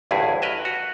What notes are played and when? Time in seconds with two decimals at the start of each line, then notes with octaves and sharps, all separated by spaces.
0.11 A1 D2 G2 E4 G#4
0.42 A#4 B4 D#5 E5
0.65 F#4